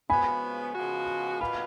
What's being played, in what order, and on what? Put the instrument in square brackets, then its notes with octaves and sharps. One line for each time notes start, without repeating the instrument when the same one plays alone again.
[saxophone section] C#3 F3 G#3 B3 F#4 [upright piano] G#5 B5
[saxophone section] C#3 F3 G#3 B3 F#4
[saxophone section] B2 A#3 F4 B4 F5 [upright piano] B5